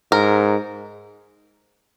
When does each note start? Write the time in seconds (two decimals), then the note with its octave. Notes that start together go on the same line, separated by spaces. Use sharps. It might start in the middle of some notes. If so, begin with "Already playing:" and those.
0.12 G#2 A#4